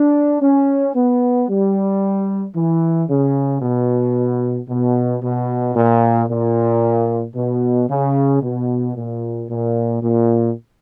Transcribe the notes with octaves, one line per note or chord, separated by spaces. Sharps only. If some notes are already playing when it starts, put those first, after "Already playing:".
Already playing: D4
C#4
B3
G3
E3
C#3
B2
B2
B2
A#2
A#2
B2
C#3
B2
A#2
A#2
A#2